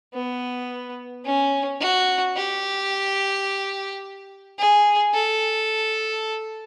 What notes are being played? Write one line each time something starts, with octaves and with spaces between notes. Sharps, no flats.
B3
C#4
F#4
G4
G#4
A4